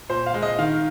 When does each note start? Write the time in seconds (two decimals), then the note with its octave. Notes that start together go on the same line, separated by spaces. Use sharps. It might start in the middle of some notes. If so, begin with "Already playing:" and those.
0.09 A#2 C5
0.26 F5
0.34 G#3
0.42 D#5
0.58 D#3 F5